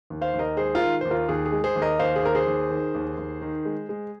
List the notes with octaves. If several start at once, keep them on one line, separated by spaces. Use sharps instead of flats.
D#2
C5 F5
D#2
A#4 D#5
G#3 G#4 C5
F4 A#4
D#3
D#2 C5
F4 A#4
D#2 G#4
G#4
G#3
G#4 C5
D#2
A#4 D#5
D#2 C5 F5
G#4
D#2 A#4
G#4 C5
D#2
D#3
D#2
D#2
D#3
G#3
G#3